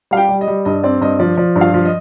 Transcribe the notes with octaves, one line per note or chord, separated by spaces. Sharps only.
G3 F5
G4 G5
G3
D#5
G3
G2 D#5
C4 D5
G2 D#5
F3 D5
F3 D5
G2
F4 F5
F3
D#5